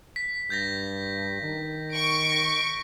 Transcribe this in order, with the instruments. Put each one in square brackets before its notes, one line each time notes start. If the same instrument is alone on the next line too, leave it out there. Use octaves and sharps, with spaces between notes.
[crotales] B6
[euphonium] G2 [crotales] G6 A6 A#6
[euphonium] D#3
[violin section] C#6 D7
[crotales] A#6